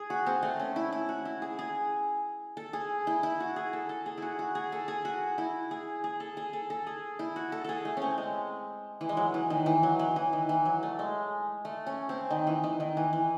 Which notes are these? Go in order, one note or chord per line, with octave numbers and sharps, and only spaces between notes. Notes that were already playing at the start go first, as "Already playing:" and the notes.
Already playing: G#4
F#4
C4
A3
C#4
E4
E4
F#4
E4
G#4
G#4
A4
G#4
E4
E4
F#4
G#4
A4
A4
G#4
E4 F#4
F#4
G#4
A4
G#4
F#4
E4
G#4
G#4
A4
G#4
A4
A4
G#4
E4
F#4
A4
G#4 A4
A3
C4 C#4
G#3
E3
G#3
F#3
E3
D#3
E3
F#3
E3
E3
D#3
E3
F#3
A3
G#3
A3
C#4
C4
D#3
E3
D#3
D#3
E3
E3